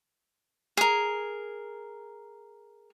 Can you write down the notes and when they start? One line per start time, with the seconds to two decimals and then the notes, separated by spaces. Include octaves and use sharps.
0.77 G#4 A#4